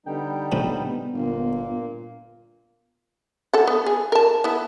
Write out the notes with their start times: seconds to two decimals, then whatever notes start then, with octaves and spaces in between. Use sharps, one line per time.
0.06 D3 G3 B3 D#4 G5
0.52 C#2 A2 F3
0.86 B3
1.13 G1 A#2 A#3
3.54 A4 F#5
3.67 B3
3.86 G#4
4.12 A#4 A5
4.44 B3 E4